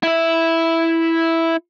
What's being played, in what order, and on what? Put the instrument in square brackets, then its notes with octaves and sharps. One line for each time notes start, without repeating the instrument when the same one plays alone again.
[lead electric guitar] E4 E5